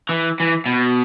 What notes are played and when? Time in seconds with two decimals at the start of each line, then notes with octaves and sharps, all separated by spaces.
0.09 E3
0.40 E3
0.66 B2